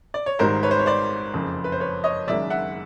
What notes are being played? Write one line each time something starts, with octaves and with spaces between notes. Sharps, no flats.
D5
C#5
G#1 G#2 D#3 G3 A#4 C5
B4 C#5
C5
C#5
C5 D5
F#1 F2 C#3
B4
C5
B4 C#5
C#5 D#5
F#1 F#2 D#3 G#3 D5 E5
E5 F#5